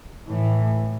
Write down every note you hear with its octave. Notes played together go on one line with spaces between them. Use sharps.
A2 E3